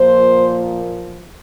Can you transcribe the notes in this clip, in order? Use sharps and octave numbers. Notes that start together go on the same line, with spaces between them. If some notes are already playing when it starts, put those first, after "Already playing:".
Already playing: A#2 F3 A#3 C5